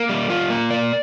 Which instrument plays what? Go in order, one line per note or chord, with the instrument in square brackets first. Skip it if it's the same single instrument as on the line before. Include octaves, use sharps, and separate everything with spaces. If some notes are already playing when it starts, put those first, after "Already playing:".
Already playing: [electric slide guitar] A#3
G3
F4
A#3
D5